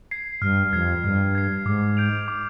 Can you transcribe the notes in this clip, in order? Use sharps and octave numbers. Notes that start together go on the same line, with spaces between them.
G#6 C7
G2 F6
F2 G#6 C7
G2 F6
G#6 C7
G#2 D6
G6 D7 F7
D6